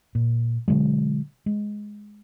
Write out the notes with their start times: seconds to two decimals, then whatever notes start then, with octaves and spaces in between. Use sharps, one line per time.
0.15 A#2
0.68 B2 D3 F#3 G#3
1.46 G#3